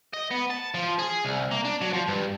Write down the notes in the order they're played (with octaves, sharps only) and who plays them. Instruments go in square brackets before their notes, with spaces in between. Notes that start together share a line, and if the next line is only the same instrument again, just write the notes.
[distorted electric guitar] D#5
B3
A5
F3
G#4
C2
A#3
D4
F#3
F3
G2